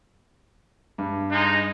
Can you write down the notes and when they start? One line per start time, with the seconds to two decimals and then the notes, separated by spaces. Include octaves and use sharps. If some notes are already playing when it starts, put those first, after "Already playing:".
0.98 G2
1.31 G#3 D#4